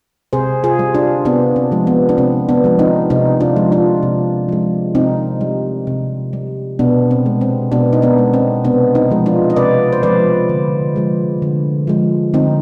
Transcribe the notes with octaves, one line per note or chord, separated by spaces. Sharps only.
C3 G#4 C5
F4 G#4
G3
D4 F4
C3 B3 D4
C4
F3 G#3
B3
D4
C3 C4
B3 D4
F3 G#3
C4 D#4
C3 C4 D#4
D4 F4
F3 G#3
D4 F4
C3
F3 G#3
C3 C4 D#4
G3
C3
G3
B2 B3 D4
C4
G#3
C4
B2 B3 D4
D#4
B3 D4
G#3
C4
C3 B3 D4
C4 D#4
F3 G#3
D4 F4
D#5
C3 B4 D5
C5
F3 G#3 B4 D5
D3
F3 G#3
D3
F3 G#3
D3 C4 D#4